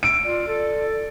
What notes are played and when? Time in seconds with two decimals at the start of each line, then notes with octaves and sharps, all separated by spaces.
0.03 E6 D7
0.24 F4 D5
0.47 A4